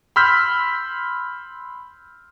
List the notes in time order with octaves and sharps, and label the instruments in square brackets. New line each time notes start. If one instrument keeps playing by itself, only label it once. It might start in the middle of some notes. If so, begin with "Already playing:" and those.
[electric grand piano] B5 C6 E6 F6 G6 B6